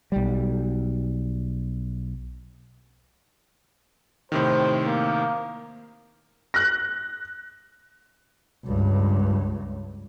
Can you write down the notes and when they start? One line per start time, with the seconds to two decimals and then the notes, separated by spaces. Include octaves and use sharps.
0.12 B1 G3
4.32 A2 C3 D#3 C5
4.86 A#3
6.54 F#6 A#6
8.66 C#2 G2